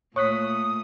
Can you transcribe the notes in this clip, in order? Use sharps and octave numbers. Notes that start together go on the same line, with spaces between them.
A#2 A3 C#5 C#6 D#6 F#6 B6